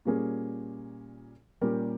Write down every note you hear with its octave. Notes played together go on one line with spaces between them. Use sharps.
A#2 G3 A#3 C#4 G#4
A#2 G3 C#4 G4 A#4